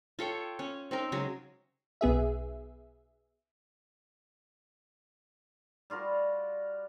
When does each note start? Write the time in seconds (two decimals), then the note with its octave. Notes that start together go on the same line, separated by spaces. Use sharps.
0.19 F4 A4 C#5 G5
0.59 C#4
0.91 C4 D#4 A#4
1.12 C#3 F#3 G#3 A#4
2.01 B1 B3 G#4 E5
5.90 G3 F4 F#4 A#4